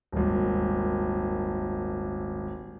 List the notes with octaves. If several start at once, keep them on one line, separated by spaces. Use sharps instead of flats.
D#1 G#1